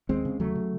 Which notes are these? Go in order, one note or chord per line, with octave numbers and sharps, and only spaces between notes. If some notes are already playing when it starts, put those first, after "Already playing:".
D#2 G#3 C4
C#3
D#2 F#3 A3
C#3